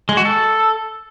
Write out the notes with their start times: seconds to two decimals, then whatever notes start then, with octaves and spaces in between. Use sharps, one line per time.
0.09 G#3
0.17 F#4
0.25 A4